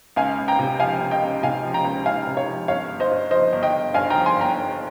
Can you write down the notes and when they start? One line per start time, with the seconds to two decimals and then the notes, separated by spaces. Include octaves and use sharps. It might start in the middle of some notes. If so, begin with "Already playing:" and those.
0.16 C#2 F5 G#5
0.39 C#2
0.48 G5 A#5
0.59 C3
0.80 F3 F5 G#5
1.00 C#2
1.11 D#5 G5
1.22 C#2
1.43 C3 F5 G#5
1.63 F3
1.74 G5 A#5
1.84 C#2
2.05 C#2 F5 G#5
2.27 C3
2.37 C#5 F5
2.47 F3
2.68 G1 C#5 F5
2.90 G1
3.00 C5 D#5
3.11 G2
3.31 F3 C5 D#5
3.53 G1
3.63 D#5 G5
3.73 G1
3.94 G2 F5 G#5
4.10 G5 A#5
4.16 F3
4.26 G#5 C6
4.36 G1 G5 A#5
4.57 G1